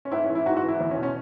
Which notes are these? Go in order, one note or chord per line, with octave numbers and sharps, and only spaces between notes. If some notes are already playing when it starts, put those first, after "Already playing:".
C#4
G#2 E4
C#4
E3
E4
G#2 F#4
F#4
E3
E4
E2 E4
C#4
B2
C#4